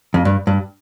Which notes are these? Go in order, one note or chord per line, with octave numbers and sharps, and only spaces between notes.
F2
G2
G2